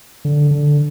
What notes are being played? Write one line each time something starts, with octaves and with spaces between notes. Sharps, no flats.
D3
D3